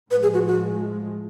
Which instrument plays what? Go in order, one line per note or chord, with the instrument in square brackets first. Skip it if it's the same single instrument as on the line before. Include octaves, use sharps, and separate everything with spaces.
[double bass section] A2 F3 G#3 [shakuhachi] B4
[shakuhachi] G#4
F#4
F#4